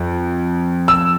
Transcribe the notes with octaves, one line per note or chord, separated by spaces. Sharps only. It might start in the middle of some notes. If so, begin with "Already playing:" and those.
Already playing: F2
E6